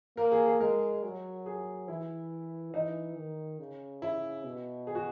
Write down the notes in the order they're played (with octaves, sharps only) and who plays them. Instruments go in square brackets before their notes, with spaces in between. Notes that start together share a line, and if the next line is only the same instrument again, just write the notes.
[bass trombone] A#3 [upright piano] A#4
[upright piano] G#4
G#4
[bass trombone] G#3 [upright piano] A#4
[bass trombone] F#3
[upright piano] G#4
[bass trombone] E3 [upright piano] E4
[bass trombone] E3 [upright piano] D#4
[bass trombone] D#3
C#3
[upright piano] E4
[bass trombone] B2
[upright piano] G#4
F#4